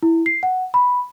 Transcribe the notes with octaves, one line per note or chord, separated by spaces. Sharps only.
E4
C7
F#5
B5